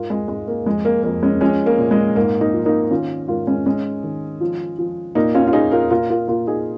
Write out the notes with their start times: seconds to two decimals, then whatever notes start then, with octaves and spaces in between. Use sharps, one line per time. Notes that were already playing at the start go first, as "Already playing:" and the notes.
Already playing: G#2 F4 A#4
0.10 G#3
0.28 G#2 G#3
0.48 A#3
0.66 F2 G#3
0.85 A#3
1.03 F2 A#3
1.23 G#3 C#4
1.41 F3 G#3 C#4
1.66 A#3
1.79 A#2
1.91 G#3
2.16 G#2 A#3
2.41 A#3 D#4
2.53 F3
2.65 A#3 D#4
2.90 D#3 C#4 F4
3.28 G#2 F4 A#4
3.47 G#3 C#4
3.66 G#2 G#3 C#4
4.04 D#3
4.41 F3
4.79 F3
5.15 A#2 A#3 D#4
5.35 C#4 F4
5.47 F4
5.53 A#2 D#4 G#4
5.71 F4 A#4
5.90 A#2 F4 A#4
6.09 F4 A#4
6.28 A#2 F4 A#4
6.47 D#4 G#4